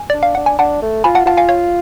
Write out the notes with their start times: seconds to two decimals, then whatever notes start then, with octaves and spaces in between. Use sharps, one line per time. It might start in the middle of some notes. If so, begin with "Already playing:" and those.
Already playing: G#5
0.10 D4 D5
0.23 F5
0.35 D4 F#5
0.46 G#5
0.59 D4 F#5 A5
0.82 A3
1.04 F4 G#5 B5
1.15 F#5 A5
1.26 F4 F#5 A5
1.37 F5 G#5
1.49 C#5 F5